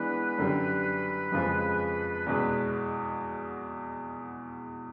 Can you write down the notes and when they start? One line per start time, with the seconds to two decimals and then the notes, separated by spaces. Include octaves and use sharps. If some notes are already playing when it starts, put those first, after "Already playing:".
Already playing: E3 G#3 B3 D4 B4
0.38 F#2 D3 G3
1.32 F2 C#3 F3 G#3
2.26 E2 B2 G#3